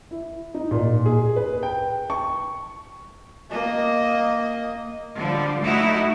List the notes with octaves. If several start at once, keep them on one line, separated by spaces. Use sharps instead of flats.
E4
D#4
A#2
G#4
B4
G5
C#6
A#3 D#5
D3 F3 G3
A3 D#4 E4 F#4